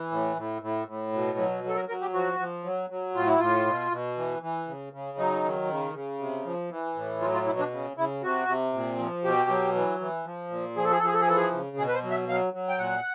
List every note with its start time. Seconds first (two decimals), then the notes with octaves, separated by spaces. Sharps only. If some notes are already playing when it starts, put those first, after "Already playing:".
Already playing: E3
0.11 A2
0.37 A2
0.62 A2
0.88 A2
1.13 B2
1.38 F#3
1.64 F#3 A4
1.76 A#4
1.88 F#3 A#4
2.02 G4
2.14 F3 F#4
2.39 F3
2.64 F#3
2.90 F#3
3.15 A2 F4
3.27 E4
3.40 A2 F4
3.66 B2
3.91 B2
4.17 E3
4.42 E3
4.67 C#3
4.93 C#3
5.18 F#3 D#4
5.44 D#3
5.69 C#3
5.94 C#3
6.19 C3
6.45 F3
6.70 E3
6.96 A2
7.21 F#3 F4
7.34 F4
7.46 B2 E4
7.59 D4
7.71 C#3
7.97 C#3 E4
8.22 C3 F#4
8.48 C3
8.74 A#2
8.98 F3
9.24 B2 G4
9.50 F#3
9.75 E3
10.00 E3
10.25 F3
10.50 A#2
10.76 F3 G#4
10.84 A4
10.91 G#4
10.98 A4
11.01 F3 G#4
11.13 A4
11.21 G#4
11.27 E3 A4
11.36 G#4
11.52 C#3
11.77 B2 G#4
11.88 B4
11.94 C5
12.03 F#3
12.11 E5
12.29 F#3 F5
12.54 F#3
12.69 G5
12.78 A#2 F#5